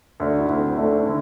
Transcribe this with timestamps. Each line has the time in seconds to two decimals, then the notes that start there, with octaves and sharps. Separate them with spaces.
0.20 D2 D4
0.39 E4
0.49 D2
0.58 C4
0.77 A3 D4
0.89 D4
0.96 E4
1.06 D3